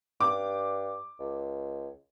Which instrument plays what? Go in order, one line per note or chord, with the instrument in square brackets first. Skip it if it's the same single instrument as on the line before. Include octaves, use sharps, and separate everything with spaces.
[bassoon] G2 [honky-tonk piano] D6
[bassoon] C#2